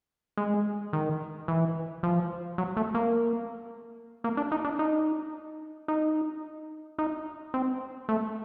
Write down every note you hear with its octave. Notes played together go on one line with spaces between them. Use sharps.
G#3
D#3
E3
F3
F#3
A3
A#3
A#3
D4
D#4
D4
D#4
D#4
D#4
C4
A3